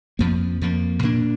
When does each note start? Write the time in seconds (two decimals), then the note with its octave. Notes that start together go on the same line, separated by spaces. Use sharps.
0.19 F2 F3 A#3
0.61 F2 F3 A#3
1.03 A#2 A#3 D4